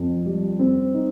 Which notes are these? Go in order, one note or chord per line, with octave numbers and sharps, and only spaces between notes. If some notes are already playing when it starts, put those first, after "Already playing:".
Already playing: F2
G3
C4
D#4